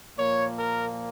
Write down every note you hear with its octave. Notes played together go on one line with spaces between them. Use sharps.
A#2 F3 A#3 C#5
A#4